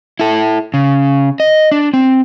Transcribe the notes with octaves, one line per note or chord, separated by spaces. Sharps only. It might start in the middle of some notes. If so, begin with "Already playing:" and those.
E4 A4
C#3
D#5
D4
C4